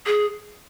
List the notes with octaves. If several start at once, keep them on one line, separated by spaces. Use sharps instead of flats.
G#4